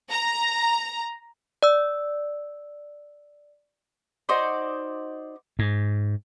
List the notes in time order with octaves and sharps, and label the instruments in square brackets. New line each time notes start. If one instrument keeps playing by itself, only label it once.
[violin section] A#5
[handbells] D5 E6
[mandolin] D#4 F#4 C5 D5
[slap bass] G#2